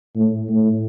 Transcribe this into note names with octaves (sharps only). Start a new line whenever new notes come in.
A2
A2